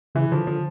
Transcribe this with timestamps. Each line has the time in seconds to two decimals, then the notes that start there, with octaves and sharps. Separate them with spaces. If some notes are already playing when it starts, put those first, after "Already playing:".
0.15 C#3 E3
0.32 D3 F3
0.47 D3 F3